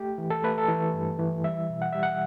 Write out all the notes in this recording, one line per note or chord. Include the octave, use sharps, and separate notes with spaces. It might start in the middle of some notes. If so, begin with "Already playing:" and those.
Already playing: A3 G4
E3
A4
A3 B4
A4
E3
G2
E3
G3 E5
B2
F#5
G3 E5
F#5